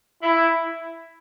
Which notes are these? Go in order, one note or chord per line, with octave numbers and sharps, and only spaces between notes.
E4